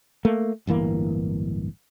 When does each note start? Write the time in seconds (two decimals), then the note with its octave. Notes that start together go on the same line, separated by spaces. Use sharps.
0.25 A3 A#3
0.67 D1 G1 E3 A#3